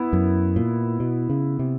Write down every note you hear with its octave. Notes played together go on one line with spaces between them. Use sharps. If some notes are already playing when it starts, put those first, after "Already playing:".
Already playing: B3 E4
F#2
A#2
B2
C#3
C3